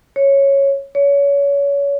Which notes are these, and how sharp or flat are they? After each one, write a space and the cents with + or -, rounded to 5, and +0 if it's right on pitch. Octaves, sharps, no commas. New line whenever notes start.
C#5 -5
C#5 +30